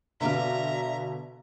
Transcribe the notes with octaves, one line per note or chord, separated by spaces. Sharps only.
B2 D3 B4 D5 E5 F5 A#5